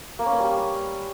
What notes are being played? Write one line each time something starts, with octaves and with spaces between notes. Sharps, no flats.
A#3
C#4
B4
G3